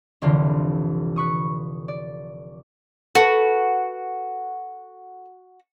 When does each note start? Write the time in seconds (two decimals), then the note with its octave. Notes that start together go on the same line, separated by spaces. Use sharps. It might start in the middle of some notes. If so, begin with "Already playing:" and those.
0.22 F1 C2 D3 E3 F4
1.16 B4 C#6 D#6
1.88 D5
3.15 F#4 A4 B4